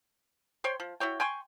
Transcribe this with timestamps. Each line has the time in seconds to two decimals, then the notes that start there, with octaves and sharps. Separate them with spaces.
0.64 C5 C#5 G5 C6
0.80 F3
1.00 E4 F#4 C#5 G5
1.20 G5 G#5 C6 C#6